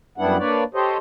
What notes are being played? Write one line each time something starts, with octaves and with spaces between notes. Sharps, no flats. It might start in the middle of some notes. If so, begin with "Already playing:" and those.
F#2 G3 B3 D4 E4 F#5
A#3 D4 B4 C#5 D5
G4 A4 C5 C#5 D#5